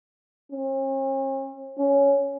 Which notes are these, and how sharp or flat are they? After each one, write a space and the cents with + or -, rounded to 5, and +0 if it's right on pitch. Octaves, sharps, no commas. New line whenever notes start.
C#4 -45
C#4 +10